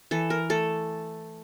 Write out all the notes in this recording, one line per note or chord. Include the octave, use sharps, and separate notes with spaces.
E3 A4
A#4
A3 A4